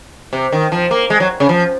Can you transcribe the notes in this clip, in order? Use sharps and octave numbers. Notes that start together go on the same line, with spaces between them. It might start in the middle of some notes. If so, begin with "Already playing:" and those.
C3
D#3
F3
A#3
G#3
F#3
C#3
F3